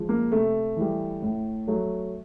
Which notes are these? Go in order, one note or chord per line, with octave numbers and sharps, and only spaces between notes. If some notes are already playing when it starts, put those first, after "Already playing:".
Already playing: F3 G#3
A#3
C3 A3
E3 G3
A2
F#3 A3